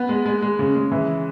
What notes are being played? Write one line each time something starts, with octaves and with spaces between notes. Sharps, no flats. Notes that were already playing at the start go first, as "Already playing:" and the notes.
Already playing: B3
G#3
G#3
G#3
C#3
G#3
E3